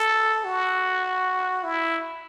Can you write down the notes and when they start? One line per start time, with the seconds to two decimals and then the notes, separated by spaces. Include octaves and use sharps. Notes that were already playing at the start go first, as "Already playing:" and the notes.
Already playing: A4
0.45 F#4
1.64 E4